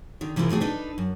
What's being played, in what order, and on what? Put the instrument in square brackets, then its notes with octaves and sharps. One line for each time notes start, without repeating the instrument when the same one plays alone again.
[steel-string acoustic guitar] D3 D#3
C3 E3 G#3 E4 F4 A#4
B2 E3 A3 G#4 G5
D4 D#4 A4 B4
F#2